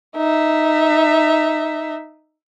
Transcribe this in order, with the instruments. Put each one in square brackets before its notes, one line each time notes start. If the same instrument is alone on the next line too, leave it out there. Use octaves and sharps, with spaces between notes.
[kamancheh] D#4 E5